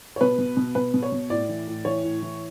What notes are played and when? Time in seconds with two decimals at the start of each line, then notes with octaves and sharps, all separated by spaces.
0.16 C#5
0.21 B2 B4
0.38 B2
0.57 B2
0.75 B2 B4
0.94 B2
1.03 C#5
1.12 B2
1.30 A2 D5
1.49 E3
1.67 A2
1.85 E3 C#5
2.04 A2
2.22 E3